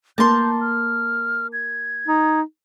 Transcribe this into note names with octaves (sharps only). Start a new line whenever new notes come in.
A#3 A#4 A5 C6 G6
F6
G#6
D#4